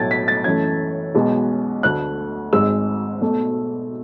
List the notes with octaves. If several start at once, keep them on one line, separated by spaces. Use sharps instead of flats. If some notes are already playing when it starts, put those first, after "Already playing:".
Already playing: B1 A2 F#3 A3 G#6 A6
B6
A6
F#2 E3 A3 G#6
B1 B2 G#3 B3
D2 D3 A3 F#6
G#1 G#2 G#3 E6
B1 B2 A3